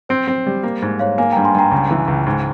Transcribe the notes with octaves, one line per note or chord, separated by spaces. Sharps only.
C4 C5
C4
G3
A#3
G#2
G#2 C#5 F5
A#3 F5 G#5
G2 G5 A#5
G#5 C6
G2 G5 A#5
C#2
E3
C#2
G#2